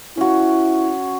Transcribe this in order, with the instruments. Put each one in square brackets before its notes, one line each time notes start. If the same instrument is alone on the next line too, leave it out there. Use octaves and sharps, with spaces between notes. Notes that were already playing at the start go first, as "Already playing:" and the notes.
[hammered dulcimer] C#4 F#4 [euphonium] E4